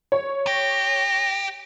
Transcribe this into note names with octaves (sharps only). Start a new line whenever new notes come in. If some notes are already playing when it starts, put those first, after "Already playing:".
C#5
G4 A#6